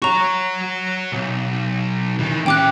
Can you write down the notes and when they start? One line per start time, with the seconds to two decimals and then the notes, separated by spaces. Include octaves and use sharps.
0.02 F#4 C#5 A#5 C#6
1.12 B1
2.19 D#3 E3
2.46 C#4 G4 G5 D6 F#6